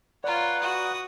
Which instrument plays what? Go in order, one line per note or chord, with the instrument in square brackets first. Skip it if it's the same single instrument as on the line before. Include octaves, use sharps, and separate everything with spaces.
[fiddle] F4 C#5 [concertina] B4 F#5 [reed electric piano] D5 A#5
[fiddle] F#4 D#6